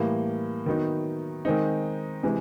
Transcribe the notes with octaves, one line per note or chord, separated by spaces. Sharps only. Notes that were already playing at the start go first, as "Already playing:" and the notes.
Already playing: A2 E3 G3 A#3
D#3 F#3 B3 D#4
D#3 G#3 C4 D#4
C3 E3 G#3